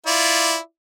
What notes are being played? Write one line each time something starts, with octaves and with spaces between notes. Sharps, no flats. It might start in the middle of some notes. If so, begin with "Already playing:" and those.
E4 F4 D5